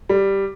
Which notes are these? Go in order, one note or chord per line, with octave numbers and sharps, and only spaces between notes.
G3